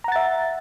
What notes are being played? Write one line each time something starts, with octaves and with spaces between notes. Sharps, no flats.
E5 F#5 A#5 A6